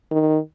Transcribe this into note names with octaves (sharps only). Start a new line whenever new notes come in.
D#3